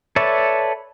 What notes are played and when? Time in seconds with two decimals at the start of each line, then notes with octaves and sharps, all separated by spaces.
0.16 A4 B4 C#5 D5 E5